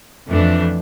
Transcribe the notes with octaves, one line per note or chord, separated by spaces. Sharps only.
F2 E3 A3 D4